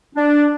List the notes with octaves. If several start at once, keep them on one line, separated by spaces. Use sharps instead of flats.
D4